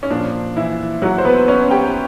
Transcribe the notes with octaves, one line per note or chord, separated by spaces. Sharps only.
C#4
A#2 F3 D4
E3 E4
F#3 F#4
C5
B3 B4
C#4 C#5
G4 G5